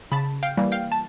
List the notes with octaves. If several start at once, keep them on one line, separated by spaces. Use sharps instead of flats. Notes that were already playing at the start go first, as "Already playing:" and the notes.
C#3 A5 B5
F5 G5
E3 G3 A#3
F5 G5
A5